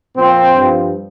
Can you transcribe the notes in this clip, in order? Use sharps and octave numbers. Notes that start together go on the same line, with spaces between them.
A#2 F3 C4
G2 F3